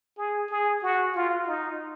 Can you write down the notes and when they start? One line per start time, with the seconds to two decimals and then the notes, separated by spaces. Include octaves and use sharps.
0.18 G#4
0.50 G#4
0.83 F#4
1.15 F4
1.48 D#4